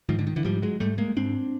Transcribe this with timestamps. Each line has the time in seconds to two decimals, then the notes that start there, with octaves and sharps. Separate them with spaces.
0.09 G#2 D#3 F3
0.19 D3
0.27 D#3
0.36 D3 E3
0.44 G#2 F3 G3
0.62 F#3 G#3
0.80 G#2 G3 A3
0.98 G#3 A#3
1.17 G#2 C4 D4